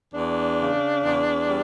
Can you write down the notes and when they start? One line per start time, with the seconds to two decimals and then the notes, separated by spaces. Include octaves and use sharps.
0.14 E2 D4
0.59 C#3
1.04 E2
1.48 G3